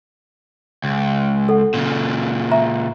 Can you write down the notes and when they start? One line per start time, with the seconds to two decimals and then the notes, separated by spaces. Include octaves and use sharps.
0.84 C#2
1.49 A4 F#5
1.74 A#2 C#3
2.51 E5 G#5 A#5